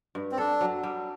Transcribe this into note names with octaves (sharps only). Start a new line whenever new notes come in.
G2
C4
D4 A4
F#3
G3